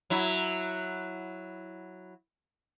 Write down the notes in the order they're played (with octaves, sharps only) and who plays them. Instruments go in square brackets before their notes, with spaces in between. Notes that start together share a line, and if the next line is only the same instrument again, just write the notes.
[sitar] F#3 E4